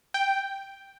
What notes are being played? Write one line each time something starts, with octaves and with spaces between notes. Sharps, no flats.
G5